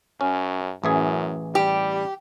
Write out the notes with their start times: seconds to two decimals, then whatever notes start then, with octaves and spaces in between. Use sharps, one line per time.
0.21 F#2 C#4
0.84 A1 F#2 E3 G#4
1.55 G3 G4